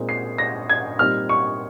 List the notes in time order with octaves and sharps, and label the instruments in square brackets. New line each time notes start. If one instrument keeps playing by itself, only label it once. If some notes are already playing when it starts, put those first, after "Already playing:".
Already playing: [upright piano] A#2 G#3 C4 D#4
C7
A#6
G#6
A#2 G3 C4 D#4 F6
C#6